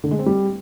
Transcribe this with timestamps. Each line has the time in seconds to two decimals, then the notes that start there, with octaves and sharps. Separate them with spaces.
0.04 D3
0.11 G#3
0.19 C4
0.26 G3